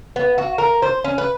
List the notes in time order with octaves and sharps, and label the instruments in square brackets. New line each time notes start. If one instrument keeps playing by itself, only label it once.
[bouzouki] B3
F#4
A#4
C5
C#4
B4